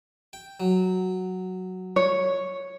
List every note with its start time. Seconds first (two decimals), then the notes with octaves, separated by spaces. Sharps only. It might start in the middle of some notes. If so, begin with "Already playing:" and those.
0.33 G5
0.60 F#3
1.96 C#5